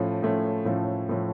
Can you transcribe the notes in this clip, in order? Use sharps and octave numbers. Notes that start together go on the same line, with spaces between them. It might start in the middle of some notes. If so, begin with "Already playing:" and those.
Already playing: A2 F3 A3 C#4
A2 F3 A3 C#4
A2 F3 A3 C#4
A2 F3 A3 C#4